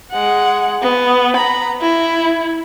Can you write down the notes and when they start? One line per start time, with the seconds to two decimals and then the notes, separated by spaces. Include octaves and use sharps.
0.12 G#3 F#5
0.83 B3
1.36 A#5 B5
1.81 E4